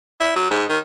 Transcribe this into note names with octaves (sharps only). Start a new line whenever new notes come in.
E4
F#3
G#2
D#3